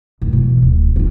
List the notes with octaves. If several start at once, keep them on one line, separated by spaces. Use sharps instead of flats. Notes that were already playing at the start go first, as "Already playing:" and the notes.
D1
B2 E3
D1
B3 F4